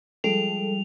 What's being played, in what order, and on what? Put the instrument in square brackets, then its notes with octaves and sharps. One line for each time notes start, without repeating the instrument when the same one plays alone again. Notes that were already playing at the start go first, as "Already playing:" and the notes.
[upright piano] F3 G#3 D7 [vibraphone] G3 [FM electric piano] A4 [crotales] F7